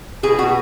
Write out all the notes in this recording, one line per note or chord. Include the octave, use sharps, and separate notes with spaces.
B2 G#4
B2 F#4